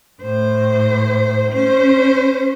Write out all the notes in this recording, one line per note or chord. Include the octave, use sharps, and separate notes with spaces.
A2 C5
C#4 C5